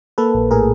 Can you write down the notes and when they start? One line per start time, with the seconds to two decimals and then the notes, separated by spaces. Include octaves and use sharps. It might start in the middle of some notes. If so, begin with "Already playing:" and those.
0.18 A#3 A4 B4
0.34 A#1
0.51 A2 G#4 A#4